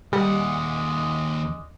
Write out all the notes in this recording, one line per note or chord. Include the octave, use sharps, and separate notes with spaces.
D#2 G3 G#3 D5 D#5 F#5